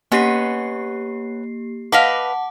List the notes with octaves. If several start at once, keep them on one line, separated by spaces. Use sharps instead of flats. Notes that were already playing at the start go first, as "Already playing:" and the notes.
A#3 B3 C#4 G4 C7
B4 D#5 F5 F#5 A5 D6